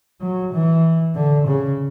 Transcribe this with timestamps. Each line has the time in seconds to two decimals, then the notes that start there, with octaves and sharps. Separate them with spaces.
0.21 F#3
0.53 E3
1.15 D3
1.46 C#3